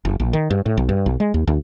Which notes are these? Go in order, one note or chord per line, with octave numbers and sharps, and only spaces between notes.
F#1
A#1
D#3
G2
A2
B1
G2
B1
G#3
D#2
D2